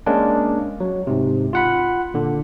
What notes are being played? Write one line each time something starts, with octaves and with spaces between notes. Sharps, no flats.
G#3 A#3 C#4 D4
F#3
G#2 C3
F4 F#5 B5
A#2 D3